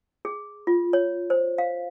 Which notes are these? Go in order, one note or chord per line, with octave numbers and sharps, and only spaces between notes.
G#4
F4
C#5
C5
F5